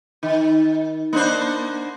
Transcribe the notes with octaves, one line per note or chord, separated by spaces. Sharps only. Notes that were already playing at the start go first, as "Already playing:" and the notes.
D#3
A#3 D4 C5